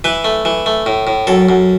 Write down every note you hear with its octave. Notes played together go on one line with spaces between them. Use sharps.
E3 B4
A3
E3
A3
A2
A2
F#2 A4
F#2